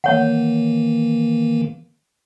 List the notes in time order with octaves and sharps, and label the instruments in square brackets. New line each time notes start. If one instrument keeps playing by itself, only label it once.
[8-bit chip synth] D#3 E3 A#3 [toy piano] C#5 F#5